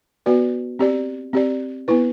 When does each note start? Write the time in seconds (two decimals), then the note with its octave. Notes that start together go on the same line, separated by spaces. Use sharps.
0.26 B3 F#4 B4 D5
0.79 C4 G4 D5
1.33 C4 G4 D5
1.88 B3 E4 B4